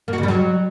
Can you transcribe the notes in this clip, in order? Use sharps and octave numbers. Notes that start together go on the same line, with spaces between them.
A#3
F#4
C#3
G3
F#3